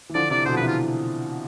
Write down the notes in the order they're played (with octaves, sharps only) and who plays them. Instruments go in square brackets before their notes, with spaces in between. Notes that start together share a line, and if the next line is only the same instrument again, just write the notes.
[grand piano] E3
[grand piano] D3 F3 [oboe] D5
[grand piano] C3 E3 [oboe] D5
[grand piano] B2 D3 [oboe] C5
[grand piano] F3
[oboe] B4
[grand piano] C3 E3
[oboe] F4